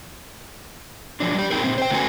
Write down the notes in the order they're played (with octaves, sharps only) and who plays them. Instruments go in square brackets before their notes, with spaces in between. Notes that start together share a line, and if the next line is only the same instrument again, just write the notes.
[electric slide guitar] F3 F#3 D4
G3 G4
C4 D#4 G4 G#4 A#4
A#2 C4
C5 G5
D3 A3 C#4 F#4 B4 G#5